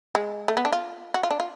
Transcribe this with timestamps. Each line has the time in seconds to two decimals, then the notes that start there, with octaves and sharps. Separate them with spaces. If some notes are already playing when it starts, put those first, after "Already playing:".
0.15 G#3
0.48 A3
0.57 B3
0.65 D4
0.72 F4
1.14 F#4
1.23 F4
1.31 D4
1.40 F4